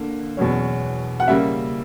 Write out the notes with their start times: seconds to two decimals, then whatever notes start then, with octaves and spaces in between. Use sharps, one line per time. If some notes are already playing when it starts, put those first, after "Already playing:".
Already playing: D3 A#3
0.37 E2 B2 F#3 C#4
1.20 F#5
1.28 C#3 G3 A#3 E5